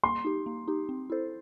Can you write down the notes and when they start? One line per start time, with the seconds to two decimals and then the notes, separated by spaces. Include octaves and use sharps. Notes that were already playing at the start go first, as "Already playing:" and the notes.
0.04 A#3 C6
0.25 D#4 G4
0.46 A#3
0.68 D#4 G4
0.89 C4
1.10 E4 A4 C5